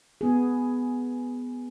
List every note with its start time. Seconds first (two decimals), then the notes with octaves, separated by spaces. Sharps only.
0.21 B3 G#4